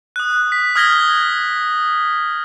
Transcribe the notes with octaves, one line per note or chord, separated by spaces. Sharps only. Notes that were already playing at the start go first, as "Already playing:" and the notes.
D#6 F#6
B6
D#6 F6 G#6 A#6 B6 G7